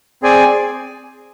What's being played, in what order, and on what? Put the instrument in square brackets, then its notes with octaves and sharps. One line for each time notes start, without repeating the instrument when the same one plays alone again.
[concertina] C4 G#4 D5 G#5